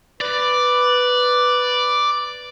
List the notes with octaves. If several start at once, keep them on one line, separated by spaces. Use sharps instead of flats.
B4 D5